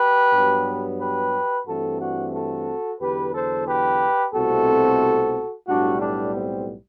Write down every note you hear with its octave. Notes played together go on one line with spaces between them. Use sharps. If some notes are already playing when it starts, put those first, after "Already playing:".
Already playing: G4 B4
G2 F#3 B3
G4 B4
G2 E3 A3 C4 F#4 A4
D4 F#4
F#4 A4
E2 D3 F#3 G4 B4
A4 C5
G4 B4
C2 B2 A3 C4 F#4 A4
B1 A2 G3 B3 D4 F#4
D4
C4